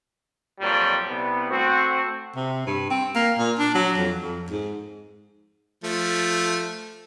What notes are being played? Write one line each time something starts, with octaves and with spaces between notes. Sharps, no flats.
F2 A#2 F#3 G3
C2 B3
A3 C4 F#4
C3
G2
C4
A#3
A#2
D4
F#3
F2
F2
G#2
F3 A3